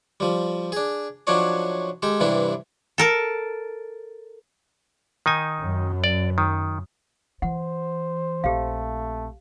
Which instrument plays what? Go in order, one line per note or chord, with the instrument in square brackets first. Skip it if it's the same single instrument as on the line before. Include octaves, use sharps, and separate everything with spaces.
[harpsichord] F3 G3
D4 G#4
F3 F#3 D4 D#4 C#5 D5
G#3 G4 A4
G2 C3 E3 G3 D4 E4
[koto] A4 A#4 A5
[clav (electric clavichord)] D#3 D#4 G#5
[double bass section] F#2
[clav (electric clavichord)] D5
D#3
[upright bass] E3 [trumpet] C5 [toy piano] F#5
[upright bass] A#1 C4 [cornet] A3 [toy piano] G4 F5